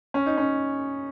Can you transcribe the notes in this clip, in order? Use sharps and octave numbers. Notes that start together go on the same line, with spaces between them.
C#4
D#4
C#4